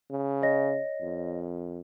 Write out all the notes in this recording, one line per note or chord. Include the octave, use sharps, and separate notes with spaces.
C#3
C#5 D#5 A#6
F2